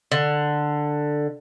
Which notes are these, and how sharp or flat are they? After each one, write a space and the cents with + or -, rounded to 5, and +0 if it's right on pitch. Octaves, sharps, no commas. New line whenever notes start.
D3 +10